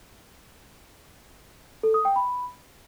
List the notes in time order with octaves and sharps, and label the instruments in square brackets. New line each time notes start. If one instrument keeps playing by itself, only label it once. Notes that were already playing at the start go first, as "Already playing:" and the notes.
[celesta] A4
D#6
G5
B5